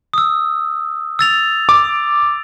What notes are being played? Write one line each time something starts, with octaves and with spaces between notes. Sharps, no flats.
D#6 E6
E6 A6 F7
D6